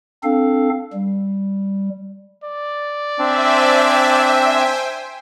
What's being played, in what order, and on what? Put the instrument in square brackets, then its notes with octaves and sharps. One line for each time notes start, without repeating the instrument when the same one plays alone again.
[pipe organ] C4 D4 A4 F5
G3
[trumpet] D5
[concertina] C4 D4 [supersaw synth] C5 G5 G#5 [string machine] E5